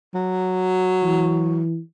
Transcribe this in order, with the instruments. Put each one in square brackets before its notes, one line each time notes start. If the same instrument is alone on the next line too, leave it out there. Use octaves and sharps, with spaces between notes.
[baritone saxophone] F#3
[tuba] E3